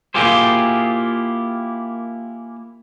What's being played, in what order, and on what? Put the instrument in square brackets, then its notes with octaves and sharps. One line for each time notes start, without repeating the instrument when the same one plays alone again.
[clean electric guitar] A#3 E4 F4 G4 G#4 C5